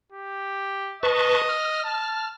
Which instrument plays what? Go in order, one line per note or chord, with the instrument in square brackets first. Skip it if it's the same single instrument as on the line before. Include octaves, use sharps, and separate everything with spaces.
[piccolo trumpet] G4
[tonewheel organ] B4 A5 C#6 [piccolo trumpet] D#5
[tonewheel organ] F6
[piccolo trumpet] A5